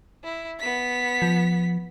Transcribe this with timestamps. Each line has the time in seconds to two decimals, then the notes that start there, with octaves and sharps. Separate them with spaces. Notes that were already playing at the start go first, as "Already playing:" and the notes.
0.24 E4
0.60 B3 B6
1.22 F3